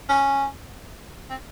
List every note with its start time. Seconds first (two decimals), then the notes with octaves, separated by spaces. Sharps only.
0.09 C#4
1.30 C4